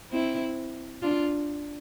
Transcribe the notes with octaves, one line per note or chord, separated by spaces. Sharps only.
C4 E4
D4 F4